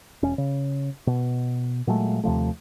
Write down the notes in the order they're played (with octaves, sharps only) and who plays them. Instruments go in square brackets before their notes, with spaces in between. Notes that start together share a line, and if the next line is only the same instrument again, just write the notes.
[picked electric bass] E1 C#4
C#3
B2
A#2 F#3 G#3 A3
D#2 C3 F3 A3